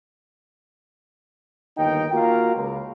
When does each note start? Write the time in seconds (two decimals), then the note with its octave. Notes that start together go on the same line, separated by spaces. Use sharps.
1.77 G1 D#2 D#4 G5
2.12 A#3 F4 F#4 F5 A#5
2.56 C#2